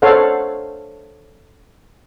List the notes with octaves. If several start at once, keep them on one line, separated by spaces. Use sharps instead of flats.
A4 C5 C#5 F5 F#5